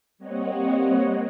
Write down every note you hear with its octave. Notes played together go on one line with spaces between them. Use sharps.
G3 A#3 C4 C#5 D#5 F#5